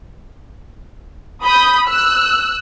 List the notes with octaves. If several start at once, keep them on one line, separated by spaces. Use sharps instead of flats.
B5 D#6 G6
E6 F#6